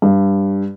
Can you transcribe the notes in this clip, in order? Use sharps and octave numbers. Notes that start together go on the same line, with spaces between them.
G2